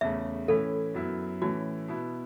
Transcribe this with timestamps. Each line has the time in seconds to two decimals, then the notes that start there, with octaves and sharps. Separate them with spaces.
0.01 E2 C#3 A3 C#4 E5
0.48 A2 E3 C#4 E4 A4
0.94 F#2 F#3 B3 E4
1.42 A2 E3 A3 C#4 F#4
1.88 B2 B3 E4